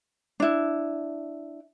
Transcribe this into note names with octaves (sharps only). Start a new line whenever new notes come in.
D4 E4